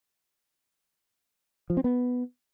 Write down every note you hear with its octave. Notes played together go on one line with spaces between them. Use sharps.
F3
C4
B3